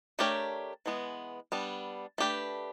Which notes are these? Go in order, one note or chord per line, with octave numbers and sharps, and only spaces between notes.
A3 D4 G4 A#4 C#5
E3 G#3 B3
G3 B3 D4
A3 D4 G4 B4